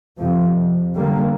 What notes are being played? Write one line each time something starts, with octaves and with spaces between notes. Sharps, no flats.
F2 C3 F3
D3 G3 A#3